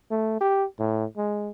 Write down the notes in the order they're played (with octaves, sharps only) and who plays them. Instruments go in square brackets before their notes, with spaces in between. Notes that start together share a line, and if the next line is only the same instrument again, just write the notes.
[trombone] A3
G4
A2
G#3